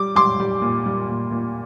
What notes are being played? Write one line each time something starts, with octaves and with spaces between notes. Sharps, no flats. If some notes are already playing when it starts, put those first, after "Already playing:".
Already playing: G3 D6
G3 C6 D6
G3
A#2
G3
A#2
A#2